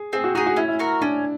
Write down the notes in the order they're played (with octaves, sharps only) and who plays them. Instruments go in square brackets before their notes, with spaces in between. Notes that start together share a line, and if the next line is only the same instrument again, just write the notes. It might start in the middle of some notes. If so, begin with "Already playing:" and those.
Already playing: [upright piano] G#4
[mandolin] C4 [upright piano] G#4
[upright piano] F#4
[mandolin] D#4 G#4 [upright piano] F#4
[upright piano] F#4
[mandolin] C#4 [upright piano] E4
[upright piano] E4
[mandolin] F#4 A#4
[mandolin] C#4 [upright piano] D4